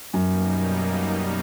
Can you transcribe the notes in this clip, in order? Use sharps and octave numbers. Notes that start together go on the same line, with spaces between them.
F#2 B2 G3 A#3 D#4